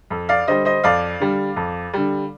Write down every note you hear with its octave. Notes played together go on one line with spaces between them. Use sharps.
F2
D5 F5
D3 G3 C5 D#5
C5 D#5
F2 D5 F5
D3 G3
F2
D3 G3